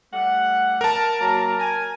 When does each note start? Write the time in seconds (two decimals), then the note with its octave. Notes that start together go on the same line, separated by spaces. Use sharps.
0.13 G3 A3 F#5
0.81 A#4 A5
1.20 F#3 A#3 A#5
1.59 G#5